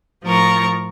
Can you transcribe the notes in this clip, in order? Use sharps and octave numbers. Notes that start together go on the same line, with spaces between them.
A2 F3 A#4 C#6